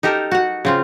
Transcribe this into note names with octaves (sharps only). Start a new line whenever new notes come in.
D#4 G4 A4 A#4
F#4 F#5
C#3 C4 F4